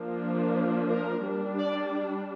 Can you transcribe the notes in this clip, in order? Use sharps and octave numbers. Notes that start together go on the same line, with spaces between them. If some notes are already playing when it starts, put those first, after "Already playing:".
Already playing: F3 A#3 D4
A#4
G3 D4
D5